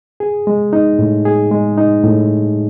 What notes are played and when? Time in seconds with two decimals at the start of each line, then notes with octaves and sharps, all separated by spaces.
0.20 G#4
0.47 G#3
0.73 D#4
0.99 A2
1.25 G#4
1.51 G#3
1.77 D#4
2.04 A2